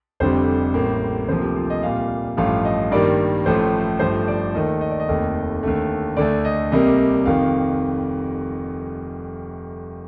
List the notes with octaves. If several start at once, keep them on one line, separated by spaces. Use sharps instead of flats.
F1 F2 D3 G3 C5
A1 A2 G3 A#3
D2 C3 F3 A#3 C5
G4
F4
D#5
C2 A#2 G3 F5
A1 G2 F3 A3 F5
D#5
G2 D#3 G3 A#3 D5
A1 A2 F3 A3 C5
G1 G2 F3 A3 C5
D5
D#2 D#3 A3 D#5
D#5
D5
D#5
F1 D#2 D#3 A3
D#2 D3 A3
D2 D3 A3 D5
D#5
C2 C3 G3 A#3 D#5
F1 F2 D#3 F5